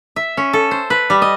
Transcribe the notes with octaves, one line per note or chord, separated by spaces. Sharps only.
E5
C#4
A4
C5
B4
G3
D#5